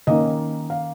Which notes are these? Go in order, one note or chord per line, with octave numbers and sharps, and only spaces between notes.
D#3 A#3 C#4 D#5
F5